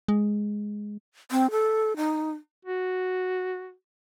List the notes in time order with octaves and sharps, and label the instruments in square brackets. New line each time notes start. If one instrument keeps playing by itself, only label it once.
[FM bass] G#3
[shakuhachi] C4
A4
D#4
[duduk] F#4